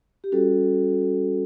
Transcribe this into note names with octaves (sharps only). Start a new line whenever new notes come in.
G4
G3 C#4 F#4 A4